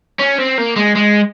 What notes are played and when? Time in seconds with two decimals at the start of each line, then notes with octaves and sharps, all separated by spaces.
0.19 C#4
0.39 C4
0.58 A#3
0.76 G#3
0.95 G#3